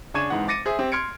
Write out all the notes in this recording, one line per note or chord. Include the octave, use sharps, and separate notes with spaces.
C#3 D4 C#6 G#6 D#7 E7
G#1 G#2 E3 F#5
D6 A6 A#6 C#7 D#7
G#4 C5 E5
C4 G4
C6 F6 G#6 C#7 D7